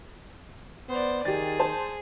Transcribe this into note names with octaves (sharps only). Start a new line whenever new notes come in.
B3 C5 D5
D#3 G4 G#4 A6
C5 A5